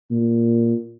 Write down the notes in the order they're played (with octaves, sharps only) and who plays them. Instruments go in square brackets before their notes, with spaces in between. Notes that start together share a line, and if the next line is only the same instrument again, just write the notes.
[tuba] A#2